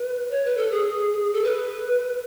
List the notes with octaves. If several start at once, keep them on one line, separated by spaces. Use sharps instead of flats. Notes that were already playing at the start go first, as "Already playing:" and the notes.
Already playing: B4
C#5
B4
A4
G#4
A4
B4